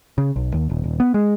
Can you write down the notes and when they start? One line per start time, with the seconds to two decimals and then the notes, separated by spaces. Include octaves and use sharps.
0.18 C#3
0.36 B1
0.54 D#2
0.70 D#1
0.84 D#1
1.00 B3
1.14 G#3